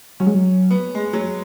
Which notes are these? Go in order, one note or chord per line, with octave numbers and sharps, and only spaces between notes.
F#3 C#4
G#3
F#3
B3
G#3
F#3